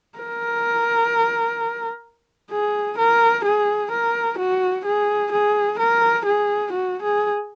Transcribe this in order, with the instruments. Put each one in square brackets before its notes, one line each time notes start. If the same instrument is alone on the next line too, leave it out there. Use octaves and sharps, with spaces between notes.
[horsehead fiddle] A#4
G#4
A#4
G#4
A#4
F#4
G#4
G#4
A#4
G#4
F#4
G#4